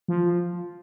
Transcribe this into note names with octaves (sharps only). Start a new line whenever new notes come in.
F3